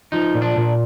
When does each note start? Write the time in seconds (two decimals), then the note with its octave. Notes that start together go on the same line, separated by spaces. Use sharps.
0.12 F3 D#4
0.35 A#2
0.42 D4
0.57 A#2